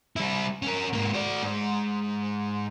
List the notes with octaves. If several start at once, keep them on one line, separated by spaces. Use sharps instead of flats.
G3 E4
C#4 A#4
G#2 A#3
F#4 D5
G#2